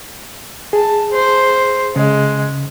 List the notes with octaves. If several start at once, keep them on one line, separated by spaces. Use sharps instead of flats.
G#4 A5
C5
C#3 G#3